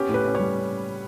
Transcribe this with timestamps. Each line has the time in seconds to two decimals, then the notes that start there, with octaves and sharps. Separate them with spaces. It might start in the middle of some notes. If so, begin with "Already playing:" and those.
Already playing: B3 C#4 G4
0.09 A2
0.14 B4
0.25 C#4
0.35 G3 C#5